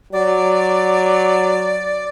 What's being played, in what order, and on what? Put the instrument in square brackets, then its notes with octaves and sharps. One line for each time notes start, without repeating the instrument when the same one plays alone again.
[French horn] F#3 [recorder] D5